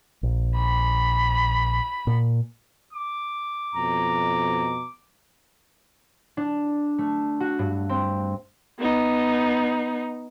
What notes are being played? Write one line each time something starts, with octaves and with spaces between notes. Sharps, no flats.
A#1
B5
A#2
D6
F2 B2 A#5
D4
A3
F#4
G2
C4
B3 D#4